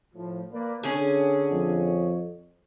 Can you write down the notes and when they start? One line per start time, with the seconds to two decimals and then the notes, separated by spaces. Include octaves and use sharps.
0.14 A2 F3
0.53 A#3 B4 D5
0.84 D3 C#4 G#4
1.52 F2